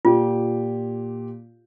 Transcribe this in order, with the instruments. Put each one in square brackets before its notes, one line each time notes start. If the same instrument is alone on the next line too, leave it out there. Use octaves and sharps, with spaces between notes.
[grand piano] A#2 G4 [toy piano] F4